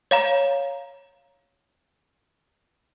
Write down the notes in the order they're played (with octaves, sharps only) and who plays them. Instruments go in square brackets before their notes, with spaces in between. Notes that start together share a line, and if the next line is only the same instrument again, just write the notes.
[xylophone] C#5 F5 A#5